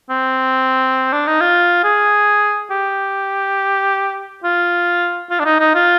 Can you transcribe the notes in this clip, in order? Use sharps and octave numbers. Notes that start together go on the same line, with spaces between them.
C4
D4
D#4
F4
G#4
G4
F4
F4
D4
D#4
D#4
F4